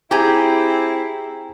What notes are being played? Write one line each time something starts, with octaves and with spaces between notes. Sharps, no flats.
C4 E4 G4 G#4 G5 G#5 A#5